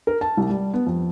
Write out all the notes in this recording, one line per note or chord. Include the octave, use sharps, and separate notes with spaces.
A#4
A5
C2
G3
B3
F2